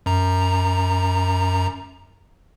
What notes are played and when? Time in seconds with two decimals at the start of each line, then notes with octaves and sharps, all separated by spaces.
0.06 F#2 A#5